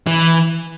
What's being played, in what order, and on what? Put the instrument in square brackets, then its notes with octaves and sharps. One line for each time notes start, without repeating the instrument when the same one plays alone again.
[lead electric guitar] E3